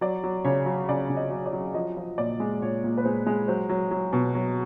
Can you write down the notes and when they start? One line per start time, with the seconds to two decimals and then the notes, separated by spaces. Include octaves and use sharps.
0.01 F#3 D5
0.24 F#3
0.44 C#3 C#5
0.66 F#3
0.89 C#3 D5
1.09 C#3
1.16 D#5
1.31 F#3
1.46 D5
1.53 F#3
1.74 F3 D#5
1.97 F3
2.18 A#2 D5
2.40 G#3
2.61 A#2 C#5
2.84 A#2
2.97 B4
3.05 G#3 C5
3.27 G#3
3.48 F#3 C5
3.69 F#3
3.91 F#3
4.13 B2
4.35 F#3